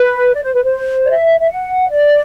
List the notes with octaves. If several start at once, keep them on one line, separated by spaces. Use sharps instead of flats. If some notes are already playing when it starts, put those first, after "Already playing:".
Already playing: B4
D5
C5
B4
C5
D5
E5
E5
F#5
D5